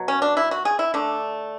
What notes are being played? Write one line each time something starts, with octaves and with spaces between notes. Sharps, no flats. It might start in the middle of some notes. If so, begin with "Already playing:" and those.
Already playing: B2 F#3
C#4
D4
E4
F#4
G#4
E4
D3 A3 D4